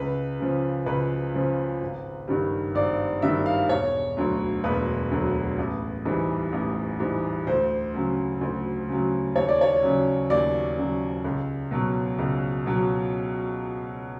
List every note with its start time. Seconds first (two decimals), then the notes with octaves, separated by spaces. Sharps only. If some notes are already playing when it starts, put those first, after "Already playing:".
Already playing: C#2 B4
0.40 C#3 F3
0.86 C#2 B4
1.34 C#3 F3
1.81 G#1
2.28 G2 D#3 G3
2.75 G#1 D5
3.22 G2 D#3 G3 E5
3.46 F5
3.69 E1 C#5
4.17 D2 D3 F#3
4.64 E1 B4
5.11 D2 D3 F#3
5.58 A1
6.05 G#2 E3 G3
6.52 A1
7.00 G#2 E3 G3
7.47 D2 C5
7.94 C#3 F#3
8.41 D2
8.88 C#3 F#3
9.36 D#2 C#5
9.49 D5
9.61 C#5
9.83 C#3 F#3
10.30 D#2 D5
10.77 C#3 F#3
11.24 C#2
11.71 B2 F#3
12.19 C#2
12.66 B2 F#3